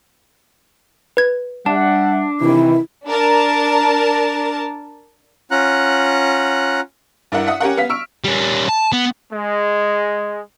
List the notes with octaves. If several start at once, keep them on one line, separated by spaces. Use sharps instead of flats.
B4 G#6
G3 D4 E5 F#5 A5
C3 D#3 E3 E4
D4 A#4 A5
C#4 F4 F#5 A#5 F#6
G2 D4 E4 A#4 F#5
E5 F#5 D#6
C#4 G4 A#4 F#5
B3 F5 B6
C#6 E6 F6 D7
G3 C#4
A5
B3
G#3